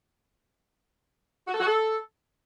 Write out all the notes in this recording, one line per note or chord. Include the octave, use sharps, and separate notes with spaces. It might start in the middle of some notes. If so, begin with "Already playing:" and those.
F#4
A4
F#4
A4